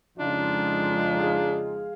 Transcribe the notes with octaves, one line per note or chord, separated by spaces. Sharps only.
F2 C#3 G#3 D4 D#4 F4
G#4 F5